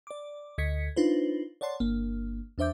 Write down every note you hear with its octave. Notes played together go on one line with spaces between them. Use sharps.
D5 D6
D2 D#5 G#6 B6 C#7
D4 D#4 F4 B4 C5
C#5 D5 F#5 A5 C6
G1 A#3
E2 D4 C5 E5 D6 G6